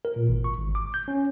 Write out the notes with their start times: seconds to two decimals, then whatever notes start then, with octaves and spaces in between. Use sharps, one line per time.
0.05 A#4
0.16 A#2
0.29 G#1
0.44 C#6
0.58 G#1
0.75 D6
0.94 G6
1.08 C#4